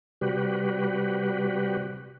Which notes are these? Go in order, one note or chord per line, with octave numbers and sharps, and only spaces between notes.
C3 G3 F#4 G4 B4